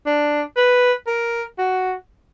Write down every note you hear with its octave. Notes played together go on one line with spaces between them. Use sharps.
D4
B4
A#4
F#4